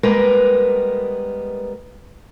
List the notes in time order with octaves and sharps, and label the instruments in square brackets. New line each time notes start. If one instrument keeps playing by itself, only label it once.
[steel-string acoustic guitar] G3 G#3 A#3 B3 A#4 B4